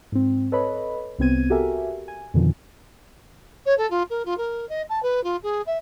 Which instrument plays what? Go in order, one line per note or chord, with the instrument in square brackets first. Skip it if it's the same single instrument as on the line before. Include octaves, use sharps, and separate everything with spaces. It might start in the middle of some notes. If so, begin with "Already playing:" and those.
[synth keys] G#2 C4
A4 B4 C#5 D#5 B5
C2 C3 B3 C4 G#6 D#7
F#4 G4 A4 A#4 E5 G#5
G#5
F2 B2 D3 D#3 F3
[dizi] C#5
A4
F4
A#4
F4
A#4
D#5
A5
B4
F4
G#4
E5